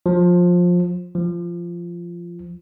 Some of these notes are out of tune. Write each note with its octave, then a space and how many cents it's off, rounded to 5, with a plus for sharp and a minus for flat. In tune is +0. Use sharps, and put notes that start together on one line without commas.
F3 +20
F3 -15